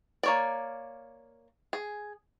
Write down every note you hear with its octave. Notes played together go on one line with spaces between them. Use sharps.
A#3 C#5 D5
G#4